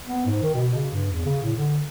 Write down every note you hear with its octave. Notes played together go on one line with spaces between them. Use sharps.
B3
G#2
D#3
B2
C#3
G2
E2
C#3
A2
D3